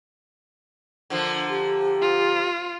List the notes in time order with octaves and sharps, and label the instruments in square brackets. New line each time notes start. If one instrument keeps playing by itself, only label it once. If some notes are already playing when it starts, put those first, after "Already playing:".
[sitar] D3 F3 A#3
[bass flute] G4
[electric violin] F4